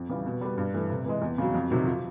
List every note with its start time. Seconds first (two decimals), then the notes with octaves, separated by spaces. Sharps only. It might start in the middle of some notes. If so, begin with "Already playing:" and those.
Already playing: F2
0.09 C#3 E3 G3
0.25 B2
0.41 G3 B3
0.58 G2
0.74 E3 A3
0.90 C3
1.06 E3 G#3
1.22 E2
1.38 C#3 F#3
1.54 F2
1.70 C3 D#3 F#3
1.86 F3